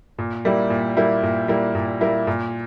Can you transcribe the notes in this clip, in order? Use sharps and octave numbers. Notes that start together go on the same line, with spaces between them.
A#2
G3 A#3 E4
A#2
G3 A#3 E4
A#2
G3 A#3 E4
A#2
G3 A#3 E4
A#2